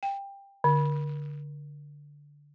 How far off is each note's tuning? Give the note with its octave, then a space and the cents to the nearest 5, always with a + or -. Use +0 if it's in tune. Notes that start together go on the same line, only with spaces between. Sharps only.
G5 +20
D3 -10